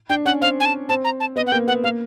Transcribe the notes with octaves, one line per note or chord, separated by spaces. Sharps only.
D4 G5
C#4 F#5
C4 F5
G#5
A5
C4 A5
A#5
A5
B3 D#5
F#5
A#3 G5
B3 F#5
A#3 F5